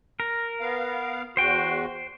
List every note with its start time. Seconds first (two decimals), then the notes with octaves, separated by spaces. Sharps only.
0.20 A#4
0.60 B3 F5
1.37 E2 F#4 C5 G5